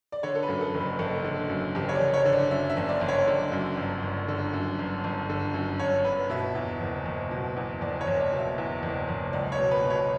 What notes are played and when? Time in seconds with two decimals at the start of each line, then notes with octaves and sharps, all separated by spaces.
0.12 D5
0.23 D3 C#5
0.35 A4
0.43 B4
0.48 F#2
0.61 A4
0.75 F#1
0.81 B4
0.99 F#1 A4
1.24 D3
1.50 F#2
1.75 F#1 G4
1.89 C#5
1.95 D5
2.01 F#1
2.14 C#5
2.25 D3
2.32 D5
2.51 F#2 E5
2.70 E5
2.77 F#1
2.89 D5
3.01 F#1
3.08 C#5
3.27 D3 D5
3.52 F#2
3.77 G1
4.03 G1
4.28 D3
4.53 F#2
4.79 G1
5.04 G1
5.30 D3
5.54 F#2
5.80 G1 C#5
6.05 G1 B4
6.30 B2 E5
6.55 E2
6.81 F#1
7.06 F#1
7.31 B2
7.57 E2
7.81 F#1 D5
8.01 C#5
8.07 F#1
8.20 D5
8.32 B2
8.39 E5
8.58 E2
8.83 F#1
9.09 F#1
9.33 C#2 D5
9.52 C#5
9.58 B2
9.71 B4
9.84 B2
9.90 C#5